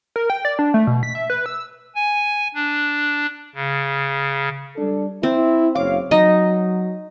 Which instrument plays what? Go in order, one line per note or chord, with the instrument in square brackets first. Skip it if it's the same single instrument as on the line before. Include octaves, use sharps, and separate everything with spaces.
[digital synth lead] A#4
G5
D5
D4
A3
B2
B6
E5
B4
E6
[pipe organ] G#5
D4
C#3
[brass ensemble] G3 D4 A4
[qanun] C4 [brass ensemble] E4
[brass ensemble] F#1 C#5 F5 [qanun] D6
[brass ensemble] F#3 [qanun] D#4 D#5